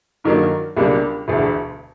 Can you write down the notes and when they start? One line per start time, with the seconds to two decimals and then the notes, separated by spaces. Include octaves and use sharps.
0.24 G2 D#3 F#3 A#3 D#4
0.77 C#2 B2 G3 A#3 D4
1.28 E1 D2 D3